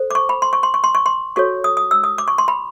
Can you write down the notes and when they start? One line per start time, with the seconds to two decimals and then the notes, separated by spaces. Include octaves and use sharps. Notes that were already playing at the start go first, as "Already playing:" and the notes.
Already playing: A4 C5
0.11 D6
0.15 C#6
0.29 B5
0.42 C6
0.53 C#6
0.63 C6
0.74 C#6
0.84 C6
0.95 C#6
1.06 C6
1.36 F#4 A4 C#5 C#6
1.64 D#6
1.77 D#6
1.91 E6
2.04 D#6
2.18 D6
2.28 C#6
2.38 C6
2.48 B5